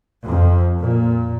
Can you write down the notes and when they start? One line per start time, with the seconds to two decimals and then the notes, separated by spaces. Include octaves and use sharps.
0.24 F2
0.81 A#2